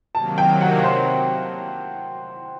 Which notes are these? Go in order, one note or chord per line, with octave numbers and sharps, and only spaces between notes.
C3 D#3 F#3 A#3 A5
G5
F#5
C5